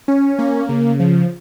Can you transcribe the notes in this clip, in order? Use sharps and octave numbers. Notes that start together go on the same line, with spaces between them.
C#4
A#3
C#3
F3